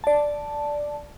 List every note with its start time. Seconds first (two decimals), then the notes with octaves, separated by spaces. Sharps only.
0.04 D5 A5